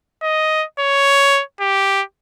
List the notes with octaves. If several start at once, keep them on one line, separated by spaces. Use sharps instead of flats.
D#5
C#5
G4